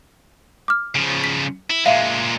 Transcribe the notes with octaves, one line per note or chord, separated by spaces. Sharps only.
D6 F6
C#3 F3
B6
E4
A#2 G#3 E5 F5